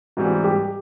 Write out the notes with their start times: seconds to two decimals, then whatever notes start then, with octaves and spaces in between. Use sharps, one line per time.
0.17 G#2 E3 G3 C4 F#4
0.44 G4